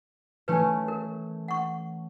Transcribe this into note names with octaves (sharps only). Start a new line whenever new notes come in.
E3 A3 C#4 B4 G#5
A#4
F#5 C#6